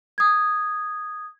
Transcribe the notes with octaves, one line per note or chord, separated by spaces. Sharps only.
D#6 G#6